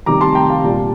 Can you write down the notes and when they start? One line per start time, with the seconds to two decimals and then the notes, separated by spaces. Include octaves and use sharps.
0.06 C3 D#3 G3 A#5 D6
0.21 A5 C6
0.35 G5 A#5
0.50 F5 A5
0.64 A#2 G3